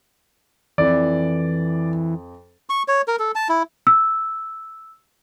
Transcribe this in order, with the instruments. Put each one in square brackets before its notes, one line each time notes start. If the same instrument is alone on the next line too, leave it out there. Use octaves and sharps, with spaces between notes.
[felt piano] F2 [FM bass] E3 [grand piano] D5
[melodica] C#6
C#5
A#4
A4
A5
E4
[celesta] E6